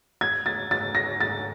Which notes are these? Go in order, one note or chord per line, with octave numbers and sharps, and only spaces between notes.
G#6
A6
A6
A#6
A6